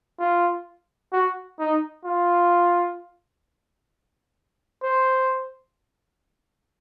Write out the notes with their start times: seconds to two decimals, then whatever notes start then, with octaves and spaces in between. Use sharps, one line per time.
0.19 F4
1.12 F#4
1.59 D#4
2.05 F4
4.83 C5